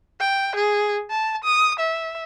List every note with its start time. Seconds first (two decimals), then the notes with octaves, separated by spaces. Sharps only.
0.20 G5
0.55 G#4
1.10 A5
1.44 D#6
1.79 E5